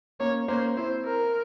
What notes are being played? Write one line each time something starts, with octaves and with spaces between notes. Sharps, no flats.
A#3 C#4 C#5
A#3 C#4 C5
C4 E4 C5
A#4